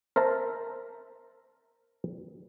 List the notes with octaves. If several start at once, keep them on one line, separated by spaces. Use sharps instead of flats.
A#4 C5 E5 A5 A#5